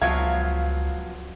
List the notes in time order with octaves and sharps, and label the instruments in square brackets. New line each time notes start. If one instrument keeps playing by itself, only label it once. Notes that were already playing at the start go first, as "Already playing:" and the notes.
[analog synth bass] C#2 [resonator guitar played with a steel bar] F3 F#3 B3 [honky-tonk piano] F5 G#6